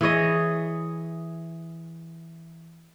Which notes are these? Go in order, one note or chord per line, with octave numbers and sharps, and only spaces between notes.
E3 G#4 C#5 D#5